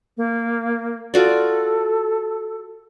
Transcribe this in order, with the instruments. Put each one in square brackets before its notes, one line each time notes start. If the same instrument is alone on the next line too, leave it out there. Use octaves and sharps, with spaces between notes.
[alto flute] A#3
[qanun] F4 F#4 D5 [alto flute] A4